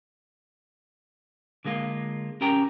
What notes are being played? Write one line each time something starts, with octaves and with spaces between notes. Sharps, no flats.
D3 G#3 A#3 F4
C#4 G4 A#4 G5 A#5